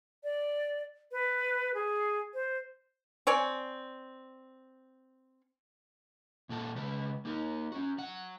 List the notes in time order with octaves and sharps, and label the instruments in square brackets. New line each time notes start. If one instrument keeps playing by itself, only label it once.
[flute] D5
B4
G#4
C5
[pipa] C4 C#5 D5 G#5
[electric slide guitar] A#2 A#3 A4 F#5 A5
C#3 G#3 B4
A#3 D#4 A#4
C#4 F#4
F#3 F#5